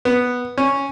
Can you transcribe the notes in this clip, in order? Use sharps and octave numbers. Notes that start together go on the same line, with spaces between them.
B3
C#4